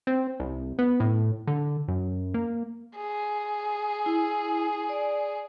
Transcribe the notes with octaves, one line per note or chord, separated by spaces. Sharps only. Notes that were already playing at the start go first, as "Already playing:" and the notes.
C4
C2
B3
A2
D3
F#2
A#3
G#4
E4
D5